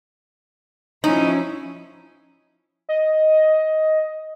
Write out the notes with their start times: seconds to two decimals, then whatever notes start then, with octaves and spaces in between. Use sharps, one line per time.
1.04 F3 C#4 D#4 E4
2.89 D#5